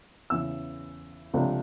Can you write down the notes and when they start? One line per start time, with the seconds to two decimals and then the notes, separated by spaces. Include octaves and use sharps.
0.30 E2 C#3 E3 E6
1.34 C#2 C3 F3 A3 D4